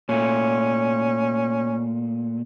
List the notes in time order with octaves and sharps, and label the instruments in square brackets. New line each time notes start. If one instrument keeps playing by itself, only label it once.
[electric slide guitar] A#2 A3 [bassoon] C#4